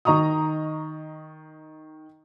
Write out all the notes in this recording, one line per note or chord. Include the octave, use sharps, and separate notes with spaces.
D#3 D#5 A#5 C#6 D#6